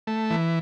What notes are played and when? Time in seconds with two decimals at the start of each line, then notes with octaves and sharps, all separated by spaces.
0.07 A3
0.30 E3